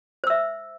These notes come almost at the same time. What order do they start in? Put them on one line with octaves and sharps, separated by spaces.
C5 E6 E5